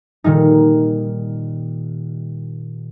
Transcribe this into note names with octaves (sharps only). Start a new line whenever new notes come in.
A#2 D#3 G3 D#4